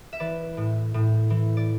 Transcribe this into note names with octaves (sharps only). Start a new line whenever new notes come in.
E5
E3 B4 D5
A2
A2
E3
D5